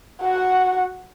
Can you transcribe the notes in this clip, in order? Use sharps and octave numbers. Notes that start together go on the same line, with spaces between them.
F#4 F#5